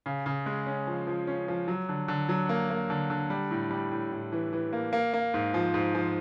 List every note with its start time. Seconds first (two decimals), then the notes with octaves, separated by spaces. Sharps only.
0.06 C#3
0.26 C#3
0.46 G#3
0.67 C#4
0.87 F3
1.07 F3
1.27 C#4
1.48 F3
1.68 F#3
1.89 D3
2.08 D3
2.29 F#3
2.49 A#3
2.70 A#3
2.90 D3
3.10 D3
3.30 G3
3.51 A2
3.71 G3
3.91 A2
4.12 A2
4.32 E3
4.53 E3
4.73 A#3
4.93 A#3
5.13 A#3
5.34 G#2
5.54 F3
5.74 G#2
5.95 F3